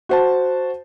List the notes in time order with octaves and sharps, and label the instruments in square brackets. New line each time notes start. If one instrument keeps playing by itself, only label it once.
[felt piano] F#4 C5 A5